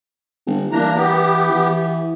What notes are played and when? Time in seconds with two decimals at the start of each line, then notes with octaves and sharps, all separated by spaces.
0.47 G1
0.72 E3 A#3 D4 A#5
0.96 B3 G4
1.51 E3